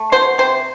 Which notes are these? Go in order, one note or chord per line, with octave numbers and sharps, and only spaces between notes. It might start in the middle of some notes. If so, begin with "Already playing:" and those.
Already playing: A3
F#3 C5
C3 C5